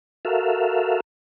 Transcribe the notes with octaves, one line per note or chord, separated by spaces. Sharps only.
F#4 A4 A#4 E5 F5